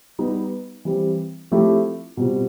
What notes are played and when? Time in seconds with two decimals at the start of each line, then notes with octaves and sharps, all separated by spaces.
0.19 G3 B3 D#4 G4 B4
0.85 E3 G3 C4
1.51 F3 A3 C4 E4 G4
2.17 B2 G3 C4 F4